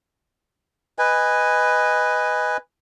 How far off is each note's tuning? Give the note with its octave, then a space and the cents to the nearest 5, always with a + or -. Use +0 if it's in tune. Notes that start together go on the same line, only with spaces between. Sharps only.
B4 +5 D#5 +0 G#5 -15